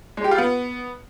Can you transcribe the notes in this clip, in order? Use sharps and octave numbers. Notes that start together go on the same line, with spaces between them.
G#3
G4
F4
B3